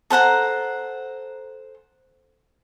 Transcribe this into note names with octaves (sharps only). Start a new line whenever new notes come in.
A4 C5 F#5 A#5